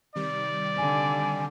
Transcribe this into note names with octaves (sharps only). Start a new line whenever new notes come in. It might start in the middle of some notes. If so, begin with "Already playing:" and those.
C3 D#3 G3 D5
D3 G#5